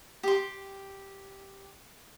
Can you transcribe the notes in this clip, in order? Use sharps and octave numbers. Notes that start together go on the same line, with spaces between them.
G4 C6